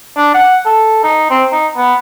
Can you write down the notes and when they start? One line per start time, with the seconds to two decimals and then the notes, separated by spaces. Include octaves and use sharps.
0.17 D4
0.34 F#5
0.65 A4
1.03 D#4
1.30 C4
1.52 D#4
1.77 B3